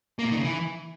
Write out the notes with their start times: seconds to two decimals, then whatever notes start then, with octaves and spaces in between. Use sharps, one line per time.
0.19 A#3
0.25 A#2
0.31 D#3
0.37 C#3
0.43 E3